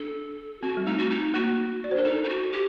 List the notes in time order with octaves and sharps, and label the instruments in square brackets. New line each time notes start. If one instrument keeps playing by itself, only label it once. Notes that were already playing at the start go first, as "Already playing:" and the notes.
Already playing: [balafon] D4 [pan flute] A4
[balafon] C4 [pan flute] F#4
[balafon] G3
[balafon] A3 [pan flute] D#4
[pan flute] F#4
D#4
[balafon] A#3 [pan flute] F#4
[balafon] D5
C5
[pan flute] D4 [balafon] A#4
[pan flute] D#4 [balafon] A4
[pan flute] D#4
F#4
G4